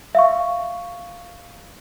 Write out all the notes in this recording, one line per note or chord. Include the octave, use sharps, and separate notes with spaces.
E5 F5 C#6